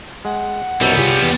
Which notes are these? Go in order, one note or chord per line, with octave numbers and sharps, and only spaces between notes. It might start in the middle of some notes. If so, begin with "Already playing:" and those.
G#3 F#5
C2 F#2 B2 G3 B3 A#4 E6
C2 F4 G4 G#4 C#5
E2